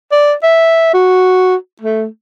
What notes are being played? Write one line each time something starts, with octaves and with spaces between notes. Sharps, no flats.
D5
E5
F#4
A3